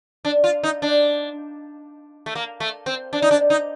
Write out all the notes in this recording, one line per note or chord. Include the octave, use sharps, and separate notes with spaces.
D4
F4
D#4
D4
A3
A#3
A3
C4
D4
D#4
D4
D#4